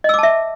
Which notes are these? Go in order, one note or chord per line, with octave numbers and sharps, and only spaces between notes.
D#5 E5 A5 D6 E6